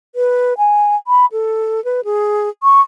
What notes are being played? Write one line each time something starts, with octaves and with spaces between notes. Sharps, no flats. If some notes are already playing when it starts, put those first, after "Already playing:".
B4
G#5
B5
A4
B4
G#4
C#6